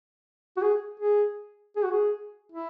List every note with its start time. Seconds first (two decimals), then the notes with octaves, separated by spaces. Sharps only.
0.57 F#4
0.62 G#4
1.00 G#4
1.76 G#4
1.84 F#4
1.91 G#4
2.52 E4